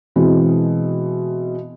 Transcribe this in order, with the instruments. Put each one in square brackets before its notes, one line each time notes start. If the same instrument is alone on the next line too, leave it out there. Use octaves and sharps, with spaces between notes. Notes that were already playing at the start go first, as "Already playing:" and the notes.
[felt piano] B2 E3 G#3 C4